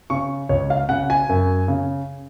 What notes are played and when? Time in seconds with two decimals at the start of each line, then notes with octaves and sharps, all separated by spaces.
0.10 C#3 C#6
0.49 C#2 C#5
0.70 F5
0.89 C#3 F#5
1.10 G#5
1.29 F#2
1.68 C#3